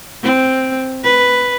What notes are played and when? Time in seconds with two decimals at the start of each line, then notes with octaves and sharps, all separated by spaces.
0.23 C4
1.03 B4